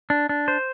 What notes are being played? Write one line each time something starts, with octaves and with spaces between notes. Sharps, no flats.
D4
D4
C5